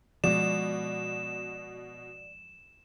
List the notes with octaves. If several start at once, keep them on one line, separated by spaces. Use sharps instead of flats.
B2 F3 G#3 D5 E7